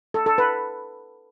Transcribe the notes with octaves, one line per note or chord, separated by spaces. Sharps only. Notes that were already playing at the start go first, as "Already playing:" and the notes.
A4
A4
B4